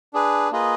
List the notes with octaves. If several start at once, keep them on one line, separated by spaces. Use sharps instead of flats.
D4 G#4 B4
A#3 F4 G#4 B4 D#5